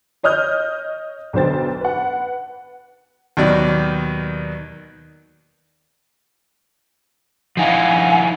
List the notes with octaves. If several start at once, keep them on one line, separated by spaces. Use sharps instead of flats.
C#5 D#5 D#6 F6 G6
B1 D3 B3 C5 G5 A6
B4 F#5
D#2 B2 D#3 F#3 D5
F3 D#4 E4 F5 F#5 G#5